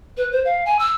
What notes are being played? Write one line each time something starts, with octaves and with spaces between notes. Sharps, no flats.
B4
C5
F5
G#5
E6